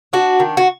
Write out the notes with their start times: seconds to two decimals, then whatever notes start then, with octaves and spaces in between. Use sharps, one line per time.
0.13 D4 F#4
0.40 D#3
0.57 F#4